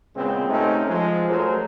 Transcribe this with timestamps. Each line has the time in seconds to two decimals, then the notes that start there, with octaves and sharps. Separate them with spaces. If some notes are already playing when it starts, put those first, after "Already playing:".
0.16 A#2 C#3 G#3 B3 C4
0.49 C3 A3 C4 C#4 D#4
0.88 F3 G#3
1.29 F#2 F#3 A3 G#4 A#4 C5